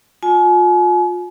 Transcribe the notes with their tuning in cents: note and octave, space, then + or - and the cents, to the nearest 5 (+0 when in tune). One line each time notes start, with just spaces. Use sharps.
F4 +30 G#5 +40